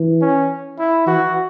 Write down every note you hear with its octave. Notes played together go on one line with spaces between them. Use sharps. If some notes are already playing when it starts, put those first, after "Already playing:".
Already playing: E3
C#4
E4
E3 F#4